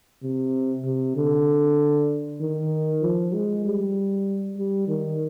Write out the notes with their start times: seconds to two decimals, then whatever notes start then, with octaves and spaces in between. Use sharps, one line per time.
0.23 C3
0.85 C3
1.16 D3
2.41 D#3
3.02 F3
3.33 G#3
3.65 G3
4.58 G3
4.88 D#3